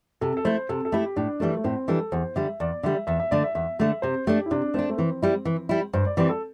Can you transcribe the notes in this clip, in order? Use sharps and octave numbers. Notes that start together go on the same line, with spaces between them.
C3 A4
A4
A3 E4 C5
C3 A4
A4
A3 E4 G4
A2 D4
E3 G3 A3 D4
A3
A2 C4
E3 G3 D4 A4
E2 C5
D3 G3 E5
E2 D5
D3 G3 E5
E2 E5
E5
D3 A3 D5
E5
E2 E5
D3 A3 E5
C3 C5
A3 D4 G4
E4
C3 D4
A3 C4 D4
A3
E3 C4
G3 E4
E3
G3 E4
G2 C5
D5
E3 G3 C4 D5
A4